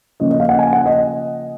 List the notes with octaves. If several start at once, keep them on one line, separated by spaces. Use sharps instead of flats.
C#3 F3 A#3 C#4 D#5
D#5
F5
F#5
G#5
F#5
D#5